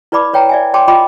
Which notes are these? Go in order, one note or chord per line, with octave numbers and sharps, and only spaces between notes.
E4 B4 D5 B5 D6
B4 C#5 G5 A5 A#5
D5 E5 G#5
C#5 G5 A5 C6 D6
F4 D#5 G5 B5 D6